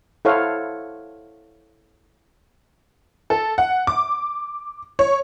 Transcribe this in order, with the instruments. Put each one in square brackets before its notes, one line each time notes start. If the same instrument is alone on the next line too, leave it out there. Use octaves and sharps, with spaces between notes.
[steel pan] E4 A4 C5 C#5 F5 F#5
[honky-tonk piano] A4
F#5
D6
C#5